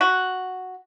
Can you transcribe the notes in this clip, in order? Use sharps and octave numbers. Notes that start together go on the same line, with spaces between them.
F#4